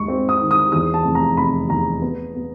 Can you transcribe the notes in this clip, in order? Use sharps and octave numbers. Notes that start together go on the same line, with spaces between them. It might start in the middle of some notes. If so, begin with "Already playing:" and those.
Already playing: D#2 G#3 C#6
C4
D#6
D#3
D#6
E2 D#6
A5
F1
A#5
F1 B5
E2 A#5
B3
B3